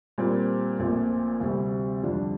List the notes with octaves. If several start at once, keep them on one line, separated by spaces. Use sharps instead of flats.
A#2 G3 C4
A#1 A#2 A3 C4
D2 C3 G3 C4
F2 D3 G3 D4 F4